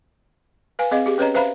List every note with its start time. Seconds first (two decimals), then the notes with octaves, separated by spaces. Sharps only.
0.79 B4 F5 G#5
0.91 C4 G#4 D#5 F5
1.06 G4 G#4
1.18 C#4 B4 C#5 D#5 A#5
1.34 B4 C5 E5 F5 A#5 B5